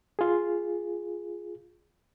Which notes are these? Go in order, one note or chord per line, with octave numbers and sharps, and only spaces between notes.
F4 G#4